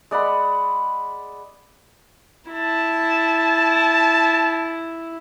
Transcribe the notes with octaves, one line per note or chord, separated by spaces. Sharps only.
G#3 D5 F#5 B5
E4 A5